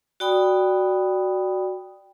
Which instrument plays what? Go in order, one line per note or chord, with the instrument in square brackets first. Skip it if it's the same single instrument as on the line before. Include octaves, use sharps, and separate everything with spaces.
[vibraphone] F#4 D5 G5 B5 D#6